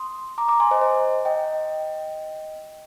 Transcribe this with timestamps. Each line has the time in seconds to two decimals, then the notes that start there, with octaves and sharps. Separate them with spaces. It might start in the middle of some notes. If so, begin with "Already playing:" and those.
Already playing: C6 D#6
0.38 A#5 D6
0.48 A#5 D6
0.60 G#5 C6
0.71 C5 D#5
0.81 C5 D#5
1.25 D#5 G5